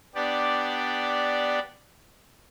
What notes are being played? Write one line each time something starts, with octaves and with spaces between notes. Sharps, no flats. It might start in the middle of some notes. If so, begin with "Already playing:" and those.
B3 D4 G4 D5